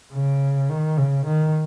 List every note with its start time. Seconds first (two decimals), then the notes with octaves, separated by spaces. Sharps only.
0.13 C#3
0.69 D#3
0.98 C#3
1.26 D#3